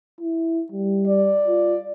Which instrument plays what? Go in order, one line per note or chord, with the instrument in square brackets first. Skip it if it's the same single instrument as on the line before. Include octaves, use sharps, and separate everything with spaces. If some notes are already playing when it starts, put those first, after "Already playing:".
[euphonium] E4
G3
[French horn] D5
[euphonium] F4